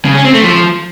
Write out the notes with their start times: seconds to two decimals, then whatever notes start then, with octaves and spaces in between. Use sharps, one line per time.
0.05 C#3
0.15 C#4
0.25 C4
0.34 A3
0.44 F3